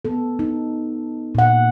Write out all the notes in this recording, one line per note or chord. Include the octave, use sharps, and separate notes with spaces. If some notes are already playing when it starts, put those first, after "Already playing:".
B3 A4
D#4
A#2 F#5